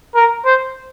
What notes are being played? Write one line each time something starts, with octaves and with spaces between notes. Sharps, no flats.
A#4
C5